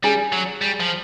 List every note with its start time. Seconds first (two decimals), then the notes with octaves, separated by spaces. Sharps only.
0.03 G3 G#4 G#5
0.32 F#3
0.62 G3
0.80 F3